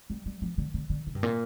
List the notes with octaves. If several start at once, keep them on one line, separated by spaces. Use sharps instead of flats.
G3
G3
F3
D3
D3
D3
C3
G2
A#2